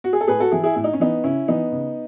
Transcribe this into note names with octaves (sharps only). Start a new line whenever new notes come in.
F#4
G#4
A4
A2 G#4 B4
F#4 A4
E3 E4 G#4
E4 G#4
A2 E4
D#4
C#4
E3 B3 D#4
C#3 C#4 E4
E3 B3 D#4
C#3